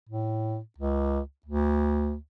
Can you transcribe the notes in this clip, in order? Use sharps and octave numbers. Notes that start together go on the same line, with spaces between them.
A2
C#2
D2